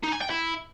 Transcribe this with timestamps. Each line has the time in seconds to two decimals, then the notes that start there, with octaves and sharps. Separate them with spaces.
0.03 D#4
0.12 G#5
0.21 G5
0.30 E4